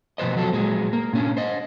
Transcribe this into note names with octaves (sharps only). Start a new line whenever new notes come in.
B2 F3 B4 C5 D#5
F3 F#3 A4
A#2 F#3 G#3
A#3
A#2 C#4 D4
C5 D#5